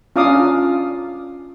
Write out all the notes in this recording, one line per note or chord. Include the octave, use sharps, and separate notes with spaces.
C#4 D4 F4 F5 D6 D#6